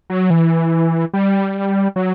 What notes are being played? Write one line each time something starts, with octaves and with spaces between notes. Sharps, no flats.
F#3
E3
G3
F#3